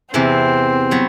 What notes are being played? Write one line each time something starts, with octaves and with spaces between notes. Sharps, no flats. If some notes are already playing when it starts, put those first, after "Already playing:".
E2 C3 E3 C4
F#3 B3